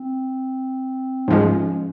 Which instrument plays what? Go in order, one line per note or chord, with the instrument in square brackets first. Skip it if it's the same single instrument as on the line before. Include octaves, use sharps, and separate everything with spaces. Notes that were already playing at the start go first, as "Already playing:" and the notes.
Already playing: [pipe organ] C4
[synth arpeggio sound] G#2 F3 G#3 [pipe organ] C#4